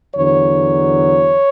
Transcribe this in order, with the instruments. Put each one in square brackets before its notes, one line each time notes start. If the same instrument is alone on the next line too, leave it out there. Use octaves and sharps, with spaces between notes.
[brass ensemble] E2 D3 F#3 C#5